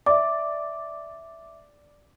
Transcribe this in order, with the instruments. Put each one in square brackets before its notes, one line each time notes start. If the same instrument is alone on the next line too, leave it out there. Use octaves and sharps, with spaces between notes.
[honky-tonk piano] D5 [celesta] E5 D6